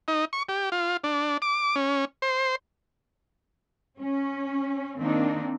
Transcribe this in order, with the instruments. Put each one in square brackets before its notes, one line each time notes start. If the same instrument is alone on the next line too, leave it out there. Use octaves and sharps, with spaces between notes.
[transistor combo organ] D#4
C#6
G4
F4
D4
D6
C#4
C5
[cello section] C#4
D#3 A#3 C4 D4 D#4